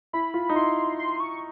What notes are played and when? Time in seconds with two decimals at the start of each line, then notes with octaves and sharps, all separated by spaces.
0.13 E4 B5
0.34 F4
0.49 D#4
0.55 E4 C6
0.99 C6
1.20 C#6